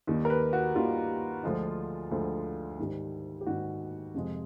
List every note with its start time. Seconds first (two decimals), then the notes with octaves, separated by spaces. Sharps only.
0.07 D#2 D#3 G3
0.25 A#4
0.30 B4
0.53 F#4
0.75 D#2 D#3 G3 F4
1.43 D2 D3 F3 G#3
2.11 D2 D3 F3 G#3
2.79 G#2 D#3 G3
3.41 G4
3.46 G#2 D#3 G3 F#4
4.14 F2 C3 F3 G#3